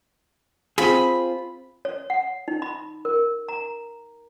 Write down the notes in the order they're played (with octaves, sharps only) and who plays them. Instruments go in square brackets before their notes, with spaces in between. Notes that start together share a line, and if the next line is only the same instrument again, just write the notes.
[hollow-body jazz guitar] C4 F4 G#4 [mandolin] B5
[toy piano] C#5
F#5
D#4
B5
A#4
A#5